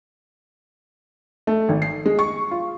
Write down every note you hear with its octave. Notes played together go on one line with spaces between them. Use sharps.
A3
G#1
C7
G#3
C#6
F4